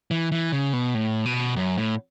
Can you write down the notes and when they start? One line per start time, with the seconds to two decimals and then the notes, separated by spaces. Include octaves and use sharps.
0.11 E3
0.32 E3
0.52 C#3
0.73 B2
0.95 A2
1.25 B2
1.56 F#2
1.78 A2